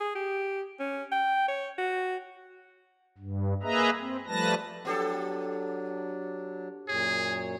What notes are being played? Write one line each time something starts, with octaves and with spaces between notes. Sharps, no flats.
G#4
G4
C#4
G5
C#5
F#4
G2
A#3 G#4 B4 D#5 E5 A#5
C4
F3 G3 A3 B4 A5 A#6
F#3 B3 D4 G4 A4
F#2 A#2 G#4 C#5